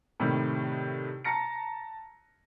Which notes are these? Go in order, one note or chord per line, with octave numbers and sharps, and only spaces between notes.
A2 C3 D#3 G3
A5 A#5 A#6 C#7